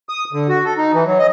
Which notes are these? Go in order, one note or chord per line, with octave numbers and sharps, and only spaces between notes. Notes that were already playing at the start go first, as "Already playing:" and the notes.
D#6
D3
F#4
A4
D#4
E3
F#3
D#5